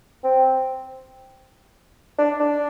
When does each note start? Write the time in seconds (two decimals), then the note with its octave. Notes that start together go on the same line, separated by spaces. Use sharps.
0.24 C4
2.18 D4
2.40 D4